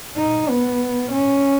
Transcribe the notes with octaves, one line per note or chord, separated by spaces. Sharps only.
D#4
B3
C#4